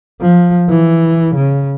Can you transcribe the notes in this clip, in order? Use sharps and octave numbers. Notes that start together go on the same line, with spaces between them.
F3
E3
C#3